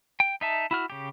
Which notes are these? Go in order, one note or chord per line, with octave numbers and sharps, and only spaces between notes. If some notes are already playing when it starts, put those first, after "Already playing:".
G5
D#4 E5 A5
E4 F#4 F6
C#3 G4